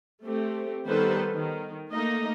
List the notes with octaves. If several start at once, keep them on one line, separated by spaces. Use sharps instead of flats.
A3 C4 G4
D#3 G3 B3 A4 B4 C5
D#3
A3 A#3 D#4 D#5